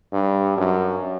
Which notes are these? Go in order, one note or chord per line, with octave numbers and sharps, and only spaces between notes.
G2
F#2